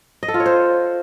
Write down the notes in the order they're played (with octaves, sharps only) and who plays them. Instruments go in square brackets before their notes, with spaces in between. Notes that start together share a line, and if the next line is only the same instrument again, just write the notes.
[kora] D#5
A4
F4
C#5
C5